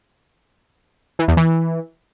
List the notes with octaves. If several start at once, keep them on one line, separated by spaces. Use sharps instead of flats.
E3
E2
E3